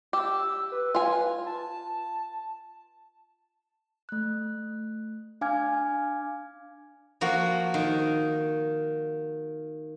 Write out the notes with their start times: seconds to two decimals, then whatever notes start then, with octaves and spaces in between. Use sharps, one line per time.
0.13 G4 E6
0.72 B4
0.95 F4 G#5
1.46 A5
4.09 A3 F#6
5.41 D4 F5 G#5 D6 F6 G#6
7.21 F3 A#3 F#4
7.74 D#3